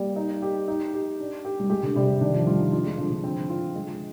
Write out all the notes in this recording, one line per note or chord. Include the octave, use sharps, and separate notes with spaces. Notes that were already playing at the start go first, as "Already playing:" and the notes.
Already playing: G3 A#3
D#4
G4
D#4
G4
D4
G4
G3
G#3 G4
D3
C3 G3
D3
D#3 D4
F3
G3 F4
D#4
D4 F4
G#3
D3 F3
D3
C4
F4
G#3